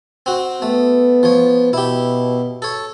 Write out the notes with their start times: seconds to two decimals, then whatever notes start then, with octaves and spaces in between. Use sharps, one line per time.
0.26 C4 F#4
0.62 A3 B3
1.23 F3 C#5
1.73 B2 E4 G4
2.62 A4 C#5